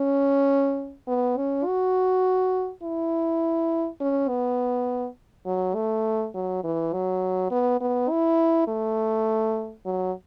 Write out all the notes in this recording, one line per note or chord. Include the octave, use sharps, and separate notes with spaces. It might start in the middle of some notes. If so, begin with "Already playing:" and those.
Already playing: C#4
B3
C#4
F#4
E4
C#4
B3
F#3
A3
F#3
E3
F#3
B3
B3
E4
A3
F#3